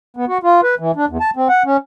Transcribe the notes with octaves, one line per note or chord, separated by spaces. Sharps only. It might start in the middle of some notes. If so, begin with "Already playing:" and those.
B3
F#4
F4
B4
E3
D4
E2
A5
C4
F#5
C#4